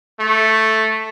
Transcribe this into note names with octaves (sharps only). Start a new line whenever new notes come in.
A3